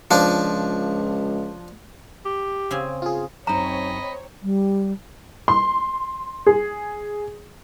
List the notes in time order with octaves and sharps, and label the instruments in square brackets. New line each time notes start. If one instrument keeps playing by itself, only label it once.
[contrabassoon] C#2 [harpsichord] F3 D4
[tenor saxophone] G4
[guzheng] C#3 C4 G#5
[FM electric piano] F4 G#4
[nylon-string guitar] F#2 D#4 [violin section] C4 C#5 [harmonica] D#5 B5 [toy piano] A#5
[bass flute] G3
[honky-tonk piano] C6
G#4